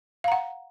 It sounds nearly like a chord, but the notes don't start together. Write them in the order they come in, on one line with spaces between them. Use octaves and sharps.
F5 A#5 F#5